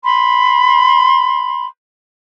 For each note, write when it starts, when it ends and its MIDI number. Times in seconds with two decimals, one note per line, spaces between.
0.03 1.66 83
0.03 1.66 84